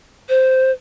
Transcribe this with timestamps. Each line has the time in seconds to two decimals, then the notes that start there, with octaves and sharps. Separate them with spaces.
0.29 C5